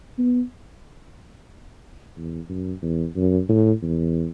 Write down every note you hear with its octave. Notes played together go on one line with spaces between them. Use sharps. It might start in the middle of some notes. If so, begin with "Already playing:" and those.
B3
E2
F#2
E2
F#2
A2
E2